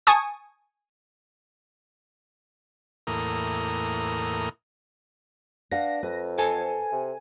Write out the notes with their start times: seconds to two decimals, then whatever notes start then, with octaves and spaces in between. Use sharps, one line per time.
0.07 G#5 A5 C#6 D#6
3.07 E2 A2 A#3 A#4 D#6
5.71 D4 B4 F5 F#5 A#6
6.03 F2 B4
6.38 A4 C5 G#5 A5
6.92 C3